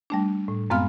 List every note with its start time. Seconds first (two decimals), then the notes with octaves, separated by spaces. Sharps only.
0.10 G3 A3 D4
0.48 A2
0.70 F#2 G#3 B3 C4 F5 F6